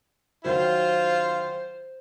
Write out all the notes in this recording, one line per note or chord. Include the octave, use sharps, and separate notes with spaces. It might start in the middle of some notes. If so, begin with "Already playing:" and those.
D#3 F#3 F4 C5